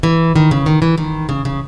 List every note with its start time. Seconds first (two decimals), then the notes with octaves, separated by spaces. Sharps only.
0.03 E3
0.36 D#3
0.51 C#3
0.66 D#3
0.82 E3
0.98 D#3
1.29 C#3
1.45 C#3